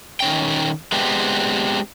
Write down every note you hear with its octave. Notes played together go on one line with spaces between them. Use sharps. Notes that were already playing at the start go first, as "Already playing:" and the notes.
D#3 C#4 G5
G#3 B3 C4 D4 G4